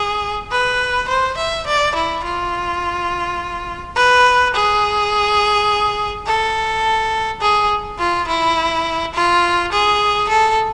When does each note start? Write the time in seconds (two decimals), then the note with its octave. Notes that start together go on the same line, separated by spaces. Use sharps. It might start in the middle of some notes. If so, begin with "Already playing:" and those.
Already playing: G#4
0.51 B4
1.08 C5
1.37 E5
1.67 D5
1.95 E4
2.24 F4
3.96 B4
4.54 G#4
6.26 A4
7.41 G#4
7.99 F4
8.28 E4
9.14 F4
9.72 G#4
10.29 A4